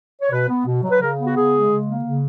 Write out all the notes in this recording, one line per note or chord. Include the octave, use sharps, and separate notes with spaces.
C#5
B2 B4
B3
B2
F#3
B4
C#3 A#4
B3
F#4
C#3 G#4
G#3
C#3
A#3
C#3